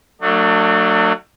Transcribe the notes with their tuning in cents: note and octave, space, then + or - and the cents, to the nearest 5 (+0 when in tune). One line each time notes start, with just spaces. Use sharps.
F#3 +0 A3 +40 D4 +35